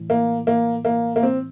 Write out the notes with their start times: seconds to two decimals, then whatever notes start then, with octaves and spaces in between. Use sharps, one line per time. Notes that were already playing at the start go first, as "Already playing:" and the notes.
Already playing: A2 E3
0.10 A#3
0.47 A#3
0.85 A#3
1.16 A#3
1.23 C4